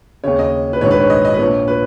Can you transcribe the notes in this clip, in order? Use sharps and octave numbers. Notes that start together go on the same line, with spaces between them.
D#2 C#3 C#5
D#5
B4
A#1 G#2 D#3 C#5
B4
C#5
D#5
D#5
B4
A#1 A#2 C#5
B4